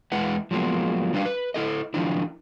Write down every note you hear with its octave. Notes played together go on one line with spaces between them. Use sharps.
E2 G#3 E4 B4 E5 F#5
F3 F#3 G#3 A#3 B3
F#3 G3 D4 B4 F5
B4
E4 A4 D#5
D#3 F3 F#3 D4 E4